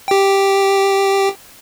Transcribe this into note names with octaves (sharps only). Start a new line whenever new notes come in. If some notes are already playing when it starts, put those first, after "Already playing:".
G4 G5